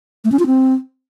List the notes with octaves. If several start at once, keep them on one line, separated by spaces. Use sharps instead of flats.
A3
C#4
F4
C4